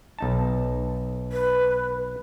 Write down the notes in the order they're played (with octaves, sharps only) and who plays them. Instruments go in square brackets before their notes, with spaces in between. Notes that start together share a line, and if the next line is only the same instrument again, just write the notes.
[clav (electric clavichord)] B1 D#4 A5
[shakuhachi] B4